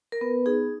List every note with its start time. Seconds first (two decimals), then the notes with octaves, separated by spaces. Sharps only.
0.12 A#4
0.21 B3 B4
0.46 D#4 G#4